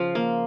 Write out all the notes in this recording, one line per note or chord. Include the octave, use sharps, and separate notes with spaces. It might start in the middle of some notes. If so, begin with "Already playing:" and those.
Already playing: C#3 F3 F5
A#3